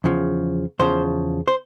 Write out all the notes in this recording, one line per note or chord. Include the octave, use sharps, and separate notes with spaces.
E2 C#3 F3
E2 C#3 F3 C5
C5